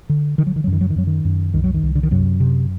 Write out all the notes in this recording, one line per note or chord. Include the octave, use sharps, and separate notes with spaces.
D3
D3 D#3
F#3
D#3
F#3
F#2
D#3
F#3
D#3
F#2 F#3
D#3
F#2
C2 D#3
F#3
D#3
C2
D3
D#3
F#2 C3 F#3
C3